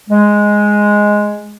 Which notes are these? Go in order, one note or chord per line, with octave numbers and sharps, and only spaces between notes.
G#3